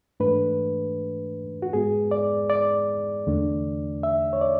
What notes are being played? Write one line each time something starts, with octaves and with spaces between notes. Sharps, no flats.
G#2 E3 A3 D4 B4
F#4
G#2 G#3 B3 G#4
D5
D5
E2 D3 A3 D4
E5
C#5
D5